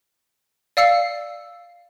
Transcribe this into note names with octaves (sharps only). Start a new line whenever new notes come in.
D5 F5 E6 C7 C#7